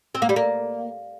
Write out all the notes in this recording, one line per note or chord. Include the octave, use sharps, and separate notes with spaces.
C4
A#3
G3
A#3